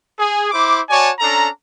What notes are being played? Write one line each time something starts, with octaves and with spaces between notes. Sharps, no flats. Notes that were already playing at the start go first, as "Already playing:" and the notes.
G#4
E4 C5 D6
F#4 C#5 D5 G#5 A5
C#4 D4 A4 A#5